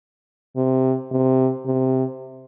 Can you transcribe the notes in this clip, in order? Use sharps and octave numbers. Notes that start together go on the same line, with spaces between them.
C3
C3
C3